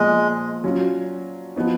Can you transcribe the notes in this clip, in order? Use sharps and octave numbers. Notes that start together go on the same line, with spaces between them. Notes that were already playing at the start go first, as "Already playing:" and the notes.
Already playing: A#2 F3 G#3 B3
F#3 C#4 F4
F3 B3 D#4